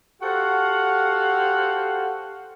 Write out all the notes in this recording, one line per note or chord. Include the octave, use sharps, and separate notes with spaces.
F#4 G4 A4 C5 F5 F#5